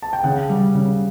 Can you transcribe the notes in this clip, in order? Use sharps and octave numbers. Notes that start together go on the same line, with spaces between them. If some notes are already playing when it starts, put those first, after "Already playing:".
A5
G5
C#3 F#5
G3
C#3